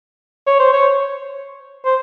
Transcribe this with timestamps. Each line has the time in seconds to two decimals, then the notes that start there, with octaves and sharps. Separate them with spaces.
0.47 C#5
0.59 C5
0.73 C#5
1.85 C5